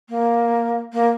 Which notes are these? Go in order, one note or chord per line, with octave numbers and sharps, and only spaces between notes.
A#3
A#3